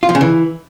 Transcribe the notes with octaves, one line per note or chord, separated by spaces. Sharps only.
F4
F3
C#3
E3